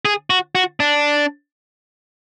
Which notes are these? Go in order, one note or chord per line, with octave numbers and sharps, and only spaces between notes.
G#4
F#4
F#4
D4